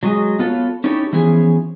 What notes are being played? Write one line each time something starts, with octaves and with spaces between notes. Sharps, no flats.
F#3 G#3 F#4 G#4 D#5
B3 F4 A4 A#4 C#5
C#4 D#4 E4 G4 A4 C#5
E3 F3 B3 C#4 G#4